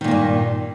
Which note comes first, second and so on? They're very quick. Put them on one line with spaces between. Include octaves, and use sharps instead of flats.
D#3 A#2 A#3 G2